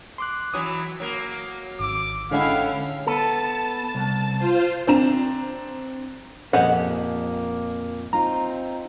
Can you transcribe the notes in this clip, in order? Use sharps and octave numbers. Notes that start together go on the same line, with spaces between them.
C6 D6 F#6
E3 F#3 D#6
F#3 A#3
G#1 D6 E6
A2 D3 G#3 C#4 E4 F5 F#5
B3 A4 A5
C2
F4 C5
C4 D4 A#5 E7
F2 A#2 A#3 G4 G#4 C5 D#5 F#5
C4 D#4 F4 A#5